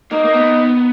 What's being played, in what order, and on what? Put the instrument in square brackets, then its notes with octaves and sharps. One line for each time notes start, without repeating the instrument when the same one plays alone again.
[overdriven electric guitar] A#3 [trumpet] D#4
[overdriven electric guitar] A#3
B3